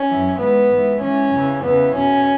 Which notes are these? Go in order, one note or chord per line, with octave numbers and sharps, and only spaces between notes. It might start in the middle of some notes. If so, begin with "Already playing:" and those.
Already playing: C#4
F#2 E3
G#2 E3 B3
G#2 E3
G#2 E3 C#4
E2 C#3 E3
E2 C#3 E3 B3
E2 B2 C#4